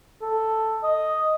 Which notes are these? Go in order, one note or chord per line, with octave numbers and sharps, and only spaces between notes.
A4
D#5